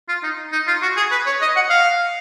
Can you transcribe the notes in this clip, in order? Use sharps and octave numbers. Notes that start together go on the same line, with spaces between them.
F4
D#4
D#4
F4
F#4
G#4
B4
C#5
D#5
F#5
F5